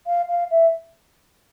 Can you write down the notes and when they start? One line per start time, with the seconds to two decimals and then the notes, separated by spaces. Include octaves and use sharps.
0.06 F5
0.28 F5
0.50 E5